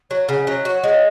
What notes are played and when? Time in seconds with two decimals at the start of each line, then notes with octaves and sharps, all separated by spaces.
0.11 F#3 C#5
0.29 C#3 F#5
0.38 D#5
0.47 F#3 C#5
0.57 D#5
0.65 F#4 C#5
0.84 G#3